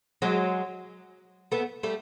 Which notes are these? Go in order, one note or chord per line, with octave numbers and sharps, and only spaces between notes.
F#3 G#3
A3 B3
G3 A3